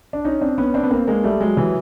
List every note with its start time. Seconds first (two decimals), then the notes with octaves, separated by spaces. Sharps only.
0.13 D4
0.25 C#4 D#4
0.41 C4 D4
0.58 B3 C#4
0.74 C4 D4
0.83 B3
0.91 A#3 C4
1.08 G#3 A#3
1.24 G3 A3
1.41 F#3 G#3
1.57 E3 F#3